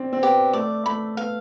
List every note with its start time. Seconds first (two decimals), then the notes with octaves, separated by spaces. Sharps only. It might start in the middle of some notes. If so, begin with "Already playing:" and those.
Already playing: C4 D4
0.13 C4
0.23 B3 G4
0.53 A3 D5
0.86 A3 B5
1.17 B3 F5